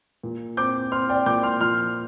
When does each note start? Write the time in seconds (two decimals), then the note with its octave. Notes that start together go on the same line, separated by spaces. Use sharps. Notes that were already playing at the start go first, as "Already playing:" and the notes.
0.23 A#2
0.57 C4 D6 G6
0.92 C4 C6 F6
1.09 D5 G5
1.26 A#2 D6 G6
1.43 C6 F6
1.60 F3 C6 F6